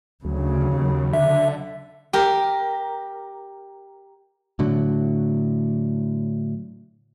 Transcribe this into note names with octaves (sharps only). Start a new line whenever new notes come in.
D2 C#3 F#3
D#2
D3 E5
G4 A#4
A2 D3 F#3